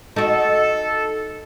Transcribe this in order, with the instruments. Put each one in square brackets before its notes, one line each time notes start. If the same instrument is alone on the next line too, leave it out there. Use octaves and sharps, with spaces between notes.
[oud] D#4 F#4 [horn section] A4